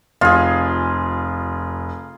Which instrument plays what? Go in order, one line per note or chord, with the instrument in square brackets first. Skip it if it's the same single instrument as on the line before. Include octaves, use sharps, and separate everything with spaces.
[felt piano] F1 [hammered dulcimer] F4 G#4